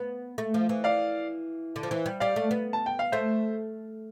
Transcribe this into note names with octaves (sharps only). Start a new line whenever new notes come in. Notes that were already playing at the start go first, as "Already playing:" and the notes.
Already playing: B3
A3
F3
E3
D5 F5
D3
F3
E3
G3
G3 D5 F5
A3
B3
A5
G5
F5
A3 C5 E5